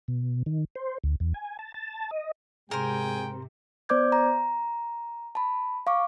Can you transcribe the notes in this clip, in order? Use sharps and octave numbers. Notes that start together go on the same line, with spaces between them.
B2
D#3
C5
D2
E2
G#5
A5
A5
D#5
G#2 C3 G#4 A#4 C5 G5
B3 C5 D5 D6 G6 G#6
A#5
A5 B5
F5 C#6 D6